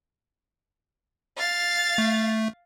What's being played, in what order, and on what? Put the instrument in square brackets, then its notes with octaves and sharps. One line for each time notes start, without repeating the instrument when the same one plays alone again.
[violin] F5 A6
[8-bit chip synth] A3